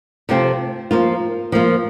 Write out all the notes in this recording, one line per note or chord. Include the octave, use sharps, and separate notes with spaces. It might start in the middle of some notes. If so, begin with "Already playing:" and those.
C3 F3 A3 C4 F4
F3 A#3 F4
F3 A#3 F4